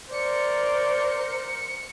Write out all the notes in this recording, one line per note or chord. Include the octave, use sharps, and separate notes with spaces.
A#4 C5 D5 C#7